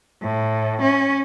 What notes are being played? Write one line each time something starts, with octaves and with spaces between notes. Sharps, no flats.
A2
C#4